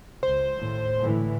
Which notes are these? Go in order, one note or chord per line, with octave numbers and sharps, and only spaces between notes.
C#2 C5
D#2 A2
A2 D3 E3